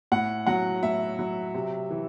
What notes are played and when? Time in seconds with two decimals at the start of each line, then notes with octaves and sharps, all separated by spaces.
0.12 A2 F#5
0.47 F#3 F#5
0.83 A2 E5
1.19 F#3
1.54 C3
1.90 E3